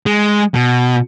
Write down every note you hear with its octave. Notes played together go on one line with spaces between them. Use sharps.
G#3
B2